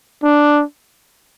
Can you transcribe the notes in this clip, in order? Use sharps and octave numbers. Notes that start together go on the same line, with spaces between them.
D4